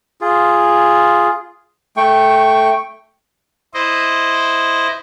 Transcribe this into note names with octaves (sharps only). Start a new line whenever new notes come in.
F4 G#4
A3 G5 C#6
E4 C5 D#5